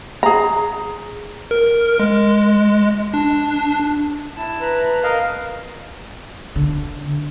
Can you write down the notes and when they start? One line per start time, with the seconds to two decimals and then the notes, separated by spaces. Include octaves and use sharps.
0.23 G#4 A#5
1.51 A#4
2.00 G#3
3.14 D4
4.37 E4 A5
4.59 B4 A#5
5.03 A#4 D#5 F5
6.56 D3